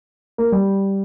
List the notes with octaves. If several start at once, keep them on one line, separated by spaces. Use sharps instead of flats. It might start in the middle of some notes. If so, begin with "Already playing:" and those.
A#3
G3